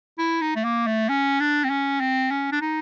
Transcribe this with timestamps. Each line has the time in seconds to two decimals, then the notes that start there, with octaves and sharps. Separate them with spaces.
0.19 E4
0.42 D#4
0.56 A3
0.64 A#3
0.87 A3
1.09 C#4
1.40 D4
1.64 C4
1.70 C#4
2.01 C4
2.31 C#4
2.52 D4
2.61 D#4